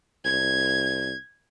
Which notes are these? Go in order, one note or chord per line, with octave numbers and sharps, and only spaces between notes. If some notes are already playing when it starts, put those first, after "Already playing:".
C2 G#6